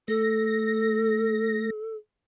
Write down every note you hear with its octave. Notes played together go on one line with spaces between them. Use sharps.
A3 A4 A#6